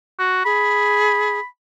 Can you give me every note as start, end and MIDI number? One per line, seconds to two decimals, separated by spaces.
0.19 0.40 66
0.45 1.39 68
0.45 1.45 83